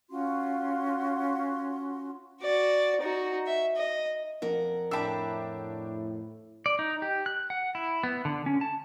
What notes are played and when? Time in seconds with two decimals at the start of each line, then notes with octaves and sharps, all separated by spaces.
0.09 C#4 F4 F#4 C6
2.42 F#4 D5
3.01 D#4 F#4
3.47 E5
3.76 D#5
4.42 F2 A#4 F#5
4.91 A2 D4 E5 G5 A5 B5
6.66 D5
6.79 D#4
7.02 G4
7.26 F#6
7.50 F#5
7.75 E4
8.04 B3
8.25 D3
8.46 C#4
8.61 A5